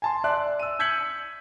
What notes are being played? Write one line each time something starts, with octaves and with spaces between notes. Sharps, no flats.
G#5 A5 C6
D5 E5 C6 F#6
E6 D#7
E6 G6 G#6 B6 C#7 F#7